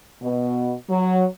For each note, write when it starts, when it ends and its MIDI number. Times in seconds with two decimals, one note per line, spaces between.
0.22 0.74 47
0.90 1.25 54